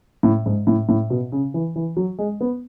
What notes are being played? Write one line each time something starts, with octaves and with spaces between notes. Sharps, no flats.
A2
G#2
A2
A2
B2
C#3
E3
E3
F#3
G#3
B3